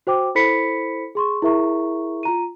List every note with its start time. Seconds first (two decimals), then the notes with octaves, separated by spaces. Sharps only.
0.07 F#4 C5 G5 D6
0.35 E4 A4 C5 B5 B6 C#7
1.15 G#4 C6 C#6
1.42 E4 G#4 A#4 E5 A#5 C#6
2.23 F4 A#5 D#7